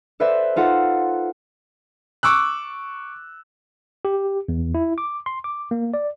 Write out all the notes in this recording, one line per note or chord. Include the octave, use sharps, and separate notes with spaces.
A4 B4 C5 D5 E5
D#4 F4 A4 F#5
C#6 D6 E6 F#6
G4
E2
E4
D6
C6
D6
A#3
D5